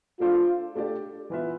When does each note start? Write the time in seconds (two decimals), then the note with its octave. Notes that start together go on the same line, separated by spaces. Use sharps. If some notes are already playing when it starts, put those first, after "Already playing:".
0.20 A3 D4 F4 A4 C5 F5
0.75 A3 D4 G4 D5
1.30 E3 B3 F4 B4 E5